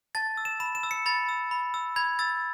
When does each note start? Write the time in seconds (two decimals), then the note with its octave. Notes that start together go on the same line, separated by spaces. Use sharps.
0.15 A5 A6
0.37 E6
0.45 E7
0.60 B5 E7
0.75 E7
0.83 E6
0.91 C#7
1.06 B5 A6
1.29 E6
1.51 B5
1.74 E6
1.96 B5 G#6
2.19 E6 A6